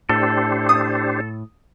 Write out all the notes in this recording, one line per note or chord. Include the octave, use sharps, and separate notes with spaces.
A2 D4 G4 A4 C5
D#6